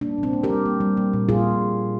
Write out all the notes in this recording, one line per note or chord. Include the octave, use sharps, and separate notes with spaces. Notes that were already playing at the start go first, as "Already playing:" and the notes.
G3 A#3 D4
A#2
C4
A#3
G4 A#4
G3
A#3
G3
A#3
A#2
A#2 F4 G#4